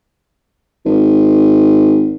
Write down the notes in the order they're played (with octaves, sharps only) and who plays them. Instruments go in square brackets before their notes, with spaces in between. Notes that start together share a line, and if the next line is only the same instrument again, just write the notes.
[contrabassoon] G#1